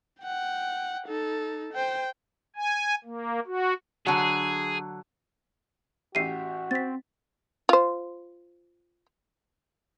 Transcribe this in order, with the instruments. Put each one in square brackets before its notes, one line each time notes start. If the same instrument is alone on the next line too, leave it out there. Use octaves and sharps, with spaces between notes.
[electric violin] F#5 G5
D#4 A4
C5 G5
[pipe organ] G#5
A#3
F#4
[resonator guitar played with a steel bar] D3 F#3 [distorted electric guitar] G#4
[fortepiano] A1 G4 E5 [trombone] F#4 [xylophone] C7 D#7
[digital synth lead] C4 [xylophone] A6 B6
[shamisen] F4 C5